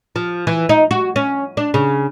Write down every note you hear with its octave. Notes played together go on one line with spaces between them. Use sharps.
F3
E3
D#4
F#4
C#4
D4
C#3